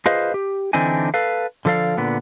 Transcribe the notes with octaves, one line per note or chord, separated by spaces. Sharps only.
F4 G#4 B4 C5 D#5 F5
G4
D3 E3 C4 D4 D#4 G#5
A4 B4 F5
D3 F3 A4 D5 F5
A#2 D3 B3